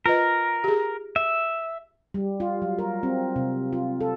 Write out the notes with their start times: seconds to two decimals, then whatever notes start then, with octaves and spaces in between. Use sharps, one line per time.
0.06 F4 A#4 B4 D#5
0.64 G4 G#4
1.16 E5
2.14 G3
2.40 F4
2.62 F#3
2.79 A#4
3.03 C4
3.36 C3
3.73 F4
4.00 A4